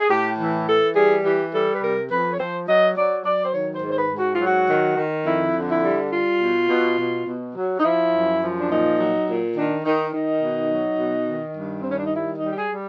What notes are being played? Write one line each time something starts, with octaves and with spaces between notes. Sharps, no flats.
G#4
A2 G4
E3
E3 A4
G3 G#4
E3 G4
G3 A4
B4
C3 A#4
F2 B4
C#5
F3 C5
F#3 D#5
F#3 D5
F#3 D5
C5
D#3 C#5
C5
G#2
C5
B4
G#2
F#4
F4
F#3
F#4
D#3
D#3
F2 E4
D3
E4
G3
G3 F4
B2
B2
B2
B2
F#3
D#4
F3 E4
F#2
F3
D4
A#2 D#4
F#3
A#2
D#3 D4
D#3 D#4
D#3 D#4
B2
F#3
B2
D#3
G2
C4
D#3 C#4
D4
D#4
G3 E4
D#4
G3
G4
G#4
G3